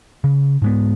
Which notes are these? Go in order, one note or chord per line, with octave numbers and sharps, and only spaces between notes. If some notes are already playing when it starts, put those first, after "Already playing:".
C#3
G#2 G#3 B3